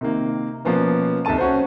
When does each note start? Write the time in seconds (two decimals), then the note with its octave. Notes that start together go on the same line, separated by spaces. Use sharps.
0.01 C3 D#3 A#3
0.65 B2 F3 A#3 B3 C#4
1.25 C2 F2 D#3 A4 A5 D#7
1.38 C#4 F#4 C5